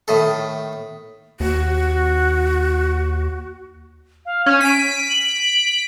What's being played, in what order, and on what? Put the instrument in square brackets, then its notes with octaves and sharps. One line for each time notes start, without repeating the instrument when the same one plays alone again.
[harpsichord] A2 D#3 A4
[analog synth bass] D#2 [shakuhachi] F#4
[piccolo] F5
[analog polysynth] C#4 [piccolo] G#6
[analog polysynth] B6 D7 [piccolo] D#7
[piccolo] F#7